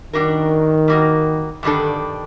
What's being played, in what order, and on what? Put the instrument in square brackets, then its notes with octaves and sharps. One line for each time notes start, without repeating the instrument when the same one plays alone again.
[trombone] D#3 [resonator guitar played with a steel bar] G3 D4 F#4 A#4
[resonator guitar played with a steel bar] G3 A#3 D#4 F#4
[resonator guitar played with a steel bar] G2 D#3 G3 D4 A4 [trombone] D3